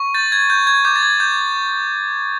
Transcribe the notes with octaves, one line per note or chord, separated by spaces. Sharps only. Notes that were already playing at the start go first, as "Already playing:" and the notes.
Already playing: C#6
G6 A6
G#6
G6
G#6
D6 G6
A6
G#6
D6 G6